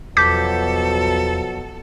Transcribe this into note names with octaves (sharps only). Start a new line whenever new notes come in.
E2 B2 F3 F#3 A4 D6 G6 B6